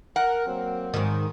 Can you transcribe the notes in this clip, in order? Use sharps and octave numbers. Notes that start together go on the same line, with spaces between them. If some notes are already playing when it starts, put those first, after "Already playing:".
A#4 F#5
F#3 A#3 C4
G#2 D#3